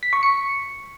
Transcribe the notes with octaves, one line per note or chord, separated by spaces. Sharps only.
B6
C#6
C#7